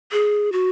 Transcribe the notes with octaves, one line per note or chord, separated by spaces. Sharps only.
G#4
F#4